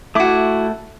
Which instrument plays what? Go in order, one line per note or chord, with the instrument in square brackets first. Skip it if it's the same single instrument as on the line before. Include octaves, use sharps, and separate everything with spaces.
[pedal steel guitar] A3 D6 [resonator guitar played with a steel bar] E4 F#4